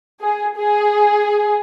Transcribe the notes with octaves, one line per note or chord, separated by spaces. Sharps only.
G#4
G#4